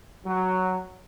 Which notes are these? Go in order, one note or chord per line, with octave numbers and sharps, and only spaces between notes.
F#3